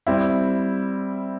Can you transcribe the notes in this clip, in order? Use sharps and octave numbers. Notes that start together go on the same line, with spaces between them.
G3 C4 E4